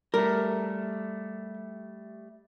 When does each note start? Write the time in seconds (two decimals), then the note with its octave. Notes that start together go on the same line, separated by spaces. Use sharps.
0.14 G3 A3 A#4